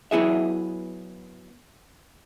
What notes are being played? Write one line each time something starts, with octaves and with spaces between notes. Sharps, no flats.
F#3 B3 E4 G#4 E5